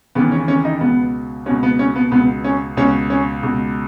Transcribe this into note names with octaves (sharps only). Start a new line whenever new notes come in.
D#2 C#3 E3 B3
C#4
C#4
D#4
C#2 B2 B3
C#2 B2 C#4
B3
C#4
B3
C#2 B2 B3
C#4
C#2 B2 C#4
C#4
C#2 B2